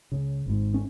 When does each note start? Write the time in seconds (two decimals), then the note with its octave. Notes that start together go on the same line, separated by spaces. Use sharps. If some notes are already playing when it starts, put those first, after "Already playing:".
0.12 C#2 C#3
0.46 G#1 G#2
0.74 C#4